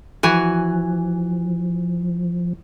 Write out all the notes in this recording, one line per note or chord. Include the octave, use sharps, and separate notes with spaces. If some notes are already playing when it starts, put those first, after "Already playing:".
E3 F3 F#4 G#5